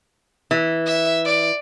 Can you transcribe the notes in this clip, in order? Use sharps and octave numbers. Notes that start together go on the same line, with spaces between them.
E3
E5
D5